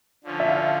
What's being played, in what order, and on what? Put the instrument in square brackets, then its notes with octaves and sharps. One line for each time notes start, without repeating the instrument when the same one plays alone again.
[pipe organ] D3 F3 C#4
[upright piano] E5
F5